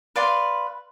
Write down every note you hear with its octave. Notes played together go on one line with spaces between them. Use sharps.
B4 D5 F5 C6